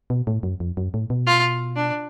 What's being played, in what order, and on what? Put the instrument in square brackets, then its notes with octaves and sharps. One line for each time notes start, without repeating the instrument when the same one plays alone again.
[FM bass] B2
A2
F#2
F2
F#2
A2
B2
[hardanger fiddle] F4
D4